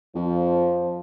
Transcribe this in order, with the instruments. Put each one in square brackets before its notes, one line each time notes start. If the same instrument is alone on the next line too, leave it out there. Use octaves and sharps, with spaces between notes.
[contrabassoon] F2 [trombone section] F3